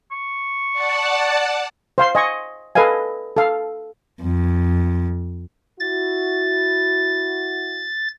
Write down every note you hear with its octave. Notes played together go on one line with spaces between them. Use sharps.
C#6
D5 F#5 A5
C5 F5 C6
D#5 G#5 C#6
A4 B4 D#5 F5 G#5
A4 F5
F2
E4 F#4 A6